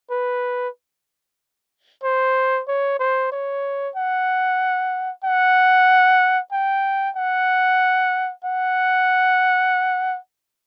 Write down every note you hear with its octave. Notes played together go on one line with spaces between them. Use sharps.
B4
C5
C#5
C5
C#5
F#5
F#5
G5
F#5
F#5